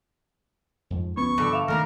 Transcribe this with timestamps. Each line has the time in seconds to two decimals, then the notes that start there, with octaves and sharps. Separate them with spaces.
0.90 F2 G#2 F3
1.17 D2 F3 B3 C#4 C#6
1.38 G2 D3 F3 A4 D5
1.53 E5 F5
1.68 G2 A#2 D3 D#3 A3 A#3 A#4